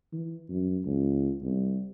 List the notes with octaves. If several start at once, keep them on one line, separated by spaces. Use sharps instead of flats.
E3
F#2
C#2
C2